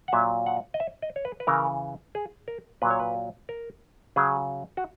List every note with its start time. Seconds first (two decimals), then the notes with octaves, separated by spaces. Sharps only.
0.08 F#5
0.13 A#2 F#3 E5
0.46 F#5
0.74 D#5
0.80 E5
1.02 D#5
1.16 C#5
1.25 B4
1.40 B4
1.47 C#3 E3 A#4
2.15 G#4
2.48 A#4
2.82 A#2 F#3 B4
2.90 C#5
3.00 B4
3.49 A#4
4.16 C#3 F#3 G#4
4.77 F#4